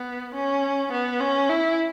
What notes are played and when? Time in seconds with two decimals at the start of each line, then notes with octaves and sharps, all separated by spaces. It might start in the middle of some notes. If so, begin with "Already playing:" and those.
Already playing: B3
0.34 C#4
0.92 B3
1.20 C#4
1.49 E4